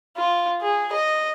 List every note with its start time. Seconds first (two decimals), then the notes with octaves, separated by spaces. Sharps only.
0.17 F4
0.61 G#4
0.92 D#5